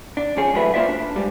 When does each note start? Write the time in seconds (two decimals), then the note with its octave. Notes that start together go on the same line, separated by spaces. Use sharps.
0.17 D4
0.37 F3 C#4 G#4
0.54 F#2 A2 A3 F#4 B4 E5
0.74 A#3 F4 C5 D5 E5
0.89 D4
1.16 G#2 G3